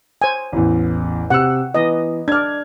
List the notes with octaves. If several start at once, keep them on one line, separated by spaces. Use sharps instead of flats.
C5 G#5
A1 E2
C3 F#5 E6
E3 B3 D#5
D4 D5 F6 G#6